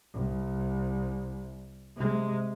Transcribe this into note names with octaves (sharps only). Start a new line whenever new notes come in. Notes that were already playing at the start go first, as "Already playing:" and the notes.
C2
C3 G#3